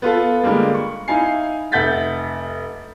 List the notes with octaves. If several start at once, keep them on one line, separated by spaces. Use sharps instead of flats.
B3 F4 A4
D3 G3 G#3 A#3
C#6
D#4 E4 F5 G#5 C7
F1 E5 F#5 G6 A6 B6